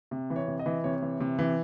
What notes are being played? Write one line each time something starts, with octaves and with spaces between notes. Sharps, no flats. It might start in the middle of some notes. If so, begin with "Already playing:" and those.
C3
E3
C#5
C3
D#5
E3
C3 C#5
E3
C3
E3